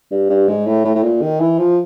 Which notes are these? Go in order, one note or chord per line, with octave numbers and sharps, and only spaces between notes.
G2
G2
G#2
A2
A2
A2
A#2
D#3
E3
F3